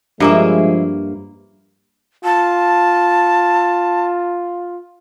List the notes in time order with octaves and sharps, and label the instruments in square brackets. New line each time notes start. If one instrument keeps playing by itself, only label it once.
[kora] G2 A#3 [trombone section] F3 G#3 [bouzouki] E4 G#4 E5
[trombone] F4 [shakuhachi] A5